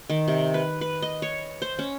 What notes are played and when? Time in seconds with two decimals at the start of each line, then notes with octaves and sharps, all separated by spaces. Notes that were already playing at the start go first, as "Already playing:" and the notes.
0.10 D#3
0.28 C3
0.54 B4
0.81 B4
1.02 D#5
1.22 C#5
1.62 C5
1.79 C#4